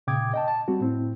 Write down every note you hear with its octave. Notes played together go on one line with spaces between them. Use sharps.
A#2 C#3 G5 D6 D#6 G#6
D#5 G5 A5
A5
G3 C4 F#4
A2 C4 E4